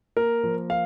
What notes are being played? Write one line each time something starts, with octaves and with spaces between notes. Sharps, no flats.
A#3 A#4
F3
F5